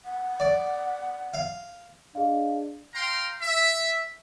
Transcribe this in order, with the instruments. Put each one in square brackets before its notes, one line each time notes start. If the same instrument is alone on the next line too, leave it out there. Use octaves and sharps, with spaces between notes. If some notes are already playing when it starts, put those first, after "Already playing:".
[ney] F#5
[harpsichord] D5
F5
[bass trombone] D4 [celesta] G#4 D#5 F5
[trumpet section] F5 G5 A#5 C6
E5